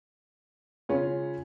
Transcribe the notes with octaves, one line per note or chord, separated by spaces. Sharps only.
C#3 G#3 C#4 F4